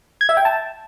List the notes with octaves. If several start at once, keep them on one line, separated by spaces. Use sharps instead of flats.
G#6
E5
G5
A5